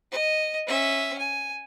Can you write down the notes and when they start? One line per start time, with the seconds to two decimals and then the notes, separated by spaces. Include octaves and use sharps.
0.11 D#5
0.67 C#4 E5
1.18 G#5